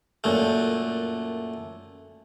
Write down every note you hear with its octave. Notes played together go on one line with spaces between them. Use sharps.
F#2 A#2 A3